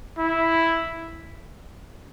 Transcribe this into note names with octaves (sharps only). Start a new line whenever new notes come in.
E4